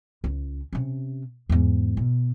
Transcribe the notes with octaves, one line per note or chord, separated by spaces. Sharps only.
C#2
C3 C#4
E2 G#2
B2